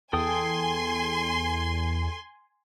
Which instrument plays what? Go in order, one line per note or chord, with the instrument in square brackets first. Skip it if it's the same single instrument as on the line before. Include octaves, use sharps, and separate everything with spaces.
[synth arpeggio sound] E2 [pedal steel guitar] A4 G5 D#6 [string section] G#5 C6